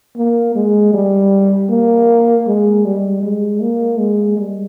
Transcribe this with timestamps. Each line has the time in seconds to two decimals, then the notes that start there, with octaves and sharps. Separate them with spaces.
0.16 A#3
0.55 G#3
0.94 G3
1.69 A#3
2.47 G#3
2.85 G3
3.23 G#3
3.61 A#3
3.99 G#3
4.38 G3